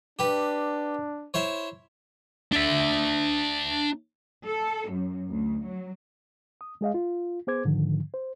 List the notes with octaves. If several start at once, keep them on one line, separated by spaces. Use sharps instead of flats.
D4 G4 B4
E4 C5 C#5
D4 E5
A4
F#2
D2
F#3
D#6
G#3 G#4 D#5 F5
F4
B3 G#4 C5 D6 G#6
G#2 D3 D#3 F3
C5